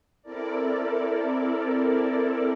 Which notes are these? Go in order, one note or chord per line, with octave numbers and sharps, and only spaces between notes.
C4 E4 A4 A#4 D5